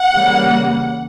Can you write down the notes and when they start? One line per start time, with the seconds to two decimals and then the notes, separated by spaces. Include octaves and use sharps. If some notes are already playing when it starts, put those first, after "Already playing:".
Already playing: F#5
0.14 C#3 E3 G3 A#3